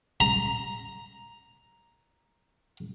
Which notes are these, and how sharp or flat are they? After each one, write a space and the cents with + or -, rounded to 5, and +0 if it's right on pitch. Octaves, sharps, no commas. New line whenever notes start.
A#5 +5